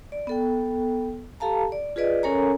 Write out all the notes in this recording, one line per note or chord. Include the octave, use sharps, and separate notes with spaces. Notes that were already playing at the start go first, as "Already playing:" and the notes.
D5
B3 A4 G5
G4 A4 F5 A5 A#5
D5
F4 G#4 B4 D5 D#5
C#4 A4 A#4 C#5 G#5 A#5